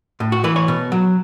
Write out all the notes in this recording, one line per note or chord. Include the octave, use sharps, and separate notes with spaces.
A2
F#4
E3 B4
C#5
B2
F#3